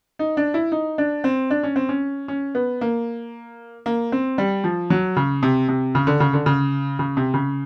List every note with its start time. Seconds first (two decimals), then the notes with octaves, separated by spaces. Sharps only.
0.19 D#4
0.37 D4
0.54 E4
0.72 D#4
0.98 D4
1.24 C4
1.50 D4
1.63 C#4
1.76 C4
1.89 C#4
2.28 C#4
2.55 B3
2.81 A#3
3.86 A#3
4.12 C4
4.38 G3
4.64 F3
4.90 F#3
5.16 C#3
5.43 C3
5.69 C3
5.95 C#3
6.07 D3
6.20 C#3
6.33 D3
6.46 C#3
6.99 C#3
7.17 C3
7.34 C#3